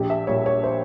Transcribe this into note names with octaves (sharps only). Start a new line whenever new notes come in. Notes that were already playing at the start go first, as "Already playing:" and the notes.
Already playing: A#1 G4
E5
A#2 G3 C#5
C#5
C5